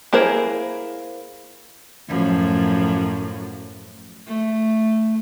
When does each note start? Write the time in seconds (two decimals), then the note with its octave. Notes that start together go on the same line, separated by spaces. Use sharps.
0.13 A#3 E4 G#4 A#4 C5
2.09 F#2 A2 F3
4.27 A3